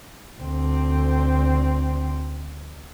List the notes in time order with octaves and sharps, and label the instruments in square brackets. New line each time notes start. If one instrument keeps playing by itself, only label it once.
[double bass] D2 C4